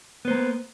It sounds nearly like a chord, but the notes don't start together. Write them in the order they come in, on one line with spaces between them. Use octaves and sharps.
B3 C5 A#3